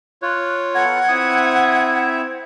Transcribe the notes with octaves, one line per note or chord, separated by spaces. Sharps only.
F4 C#5 F#6
B3 A4 F#5 A#5 G#6
C4 E4 E5 D#6